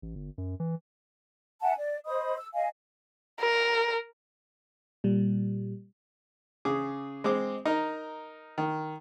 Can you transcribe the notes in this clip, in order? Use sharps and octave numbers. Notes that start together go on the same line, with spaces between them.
A1
G1
F#2
E3
E5 F#5 G#5 A5
D5
C5 D#5 B5 D#6
E6
D#5 F5 G#5
A#4
A#2 G3
C#3 G#4 D6
G#3 C4 D6
D#4 A#4
D#3